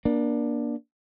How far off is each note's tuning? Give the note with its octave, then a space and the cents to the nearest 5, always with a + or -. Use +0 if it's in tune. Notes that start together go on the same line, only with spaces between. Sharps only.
A#3 +30 D4 +0